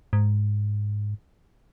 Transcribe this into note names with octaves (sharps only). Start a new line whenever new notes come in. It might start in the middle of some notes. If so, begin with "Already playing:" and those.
G#2